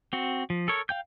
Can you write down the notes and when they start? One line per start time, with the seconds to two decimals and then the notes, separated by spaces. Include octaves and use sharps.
0.13 C4 F#4
0.50 F3
0.68 A4 A#4 C#5
0.89 F5 G5 G6